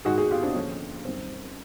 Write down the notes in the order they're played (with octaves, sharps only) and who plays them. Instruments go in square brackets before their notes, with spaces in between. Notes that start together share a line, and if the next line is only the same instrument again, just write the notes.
[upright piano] G#2 D#3 G#3 F#4 G#4
F#4 G#4
F4 G4
C4 D4
D#2 D3 F3 C#4
F#2 D#3 G3 C4